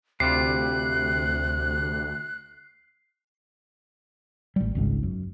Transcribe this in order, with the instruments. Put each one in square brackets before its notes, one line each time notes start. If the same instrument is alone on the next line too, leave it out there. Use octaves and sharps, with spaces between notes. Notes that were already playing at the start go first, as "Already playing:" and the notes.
[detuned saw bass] D2 [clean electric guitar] C3 G3 F4 [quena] F#6 [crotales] C7
[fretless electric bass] A1 G3
G#1 C#2 G#2
F#2